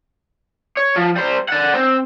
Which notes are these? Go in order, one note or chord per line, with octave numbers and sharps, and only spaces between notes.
C#5
F3
G3 C5
D5 F#5
C4